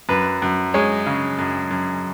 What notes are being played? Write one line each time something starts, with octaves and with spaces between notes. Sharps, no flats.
F#2 B4
F#2
G#3 C#5
C#3
F#2
F#2